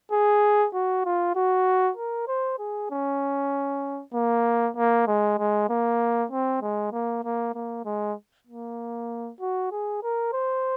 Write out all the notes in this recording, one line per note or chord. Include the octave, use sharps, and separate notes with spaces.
G#4
F#4
F4
F#4
A#4
C5
G#4
C#4
A#3
A#3
G#3
G#3
A#3
C4
G#3
A#3
A#3
A#3
G#3
A#3
F#4
G#4
A#4
C5